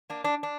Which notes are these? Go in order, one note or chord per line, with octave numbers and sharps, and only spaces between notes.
A#3 D4
D4
D4